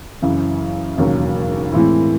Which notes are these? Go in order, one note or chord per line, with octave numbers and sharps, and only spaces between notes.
F#2 C#3 E3
E1 D#2 C#3 F#3
A2 E3 G#3 C4 E4